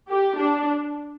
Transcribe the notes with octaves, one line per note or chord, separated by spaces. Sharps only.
G4
D4